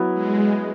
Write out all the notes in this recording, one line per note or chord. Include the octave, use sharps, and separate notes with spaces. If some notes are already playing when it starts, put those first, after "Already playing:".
Already playing: F#3 B3 E4
G#3